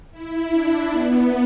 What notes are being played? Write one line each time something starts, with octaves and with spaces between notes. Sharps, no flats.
E4
D4
B3